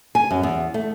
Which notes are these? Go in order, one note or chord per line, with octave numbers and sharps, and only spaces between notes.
G#5
F#2
E2
A3